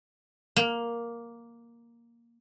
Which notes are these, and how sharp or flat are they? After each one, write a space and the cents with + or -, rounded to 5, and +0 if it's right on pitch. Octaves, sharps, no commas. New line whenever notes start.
A#3 +5